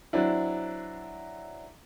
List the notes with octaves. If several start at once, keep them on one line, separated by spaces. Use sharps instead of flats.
F#3 C4 D4 E4